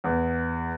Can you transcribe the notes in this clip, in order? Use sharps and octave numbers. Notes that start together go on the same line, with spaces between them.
E2